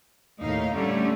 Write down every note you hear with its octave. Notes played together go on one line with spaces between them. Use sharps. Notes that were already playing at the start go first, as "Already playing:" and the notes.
D#2 A2 D#4 F5
D3 G3 A3 C#4